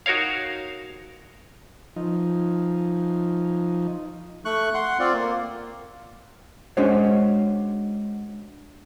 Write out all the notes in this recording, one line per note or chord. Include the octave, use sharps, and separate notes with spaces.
D#4 F#4 A#4 C#5 F5
F3 D#4
A3 C#6 F#6
F#5 C6
C4 F4 D5
A#3
G#3 C#4 D4 F#4 C5 C#5